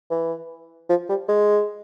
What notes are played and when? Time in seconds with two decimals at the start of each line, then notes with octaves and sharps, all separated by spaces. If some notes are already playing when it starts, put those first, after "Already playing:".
0.11 E3
0.89 F3
1.09 G3
1.28 G#3